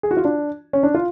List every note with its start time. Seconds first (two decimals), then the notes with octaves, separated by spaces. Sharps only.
0.03 G#4
0.11 F#4
0.17 F4
0.25 D4
0.73 C#4
0.83 D4
0.94 F4